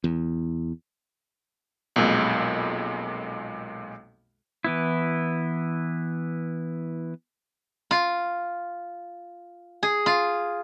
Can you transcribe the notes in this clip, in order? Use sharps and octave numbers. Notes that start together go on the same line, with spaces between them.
E2
B1 F2 A#2 G#3
E3 B3 E4
F4
G#4
F4